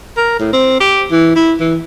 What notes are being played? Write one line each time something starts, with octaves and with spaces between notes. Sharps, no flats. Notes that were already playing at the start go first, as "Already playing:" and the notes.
A#4
A2
C4
G4
E3
E4
E3